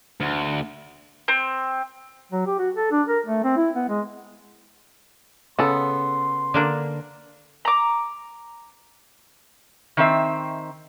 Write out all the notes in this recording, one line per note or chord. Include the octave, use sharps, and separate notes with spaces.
D2
C4
F#3
G4
F#4
A4
D4
A#4
A3
C4
E4
B3
G#3
C#3 B3 A4 C6
D3 A#3 D4
A#5 D6
D#3 C4 E5